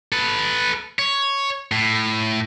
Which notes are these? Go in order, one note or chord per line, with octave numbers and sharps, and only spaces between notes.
A4 B4
C#5
A2